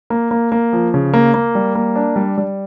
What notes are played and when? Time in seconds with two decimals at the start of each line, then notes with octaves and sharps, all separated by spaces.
0.10 A#3
0.31 A#3
0.52 A#3
0.73 F3
0.94 C#3
1.14 A#3
1.34 A#3
1.55 G3
1.75 A#3
1.96 D4
2.16 G3
2.38 G3